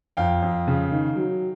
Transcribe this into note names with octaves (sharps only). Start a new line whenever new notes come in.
F2 F5 G5
F2
C#3
D#3
F#3